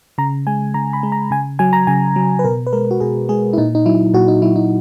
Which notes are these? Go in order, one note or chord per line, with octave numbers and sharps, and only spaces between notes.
C#3 A#5
G#3 G#5
C#3 A#5
B5
G#3
A#5
C#3 G#5
F#3 G#5
A#5
C#3 G#5
F#3
B4
B2 A#4
B4
G#3 A#4
F#4
B2 G#4
G#3 G#4
E4
A#2 D#4
D#4
F#3 E4
A#2 F#4
D#4
F#3 E4
D#4